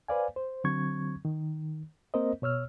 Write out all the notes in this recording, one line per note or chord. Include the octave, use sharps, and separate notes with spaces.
B4 C5 D5 F5 G#5
C5
D3 F#3 C4 C#6 G#6
D#3
A#3 C4 A#4 C5 D#5
B2 C#5 E6 F6